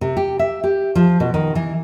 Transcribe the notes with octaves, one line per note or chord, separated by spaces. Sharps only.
C3
G4
E5
G4
F3
B2
D#3
E3